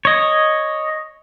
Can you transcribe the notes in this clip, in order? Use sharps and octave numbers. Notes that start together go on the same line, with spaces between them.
C#5 D#5